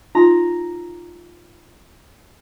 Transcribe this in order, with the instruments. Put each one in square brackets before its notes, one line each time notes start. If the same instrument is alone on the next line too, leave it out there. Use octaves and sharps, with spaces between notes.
[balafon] D#4 F4 [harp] A#5